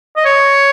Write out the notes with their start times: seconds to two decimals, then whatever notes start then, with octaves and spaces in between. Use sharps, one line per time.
0.17 D#5
0.25 C#5